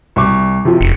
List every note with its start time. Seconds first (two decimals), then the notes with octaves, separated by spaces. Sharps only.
0.16 C2 C#6 D6
0.65 C3 F3
0.81 F1 C#7